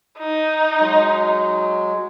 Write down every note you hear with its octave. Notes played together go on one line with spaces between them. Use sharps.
D#4
F#3 G#3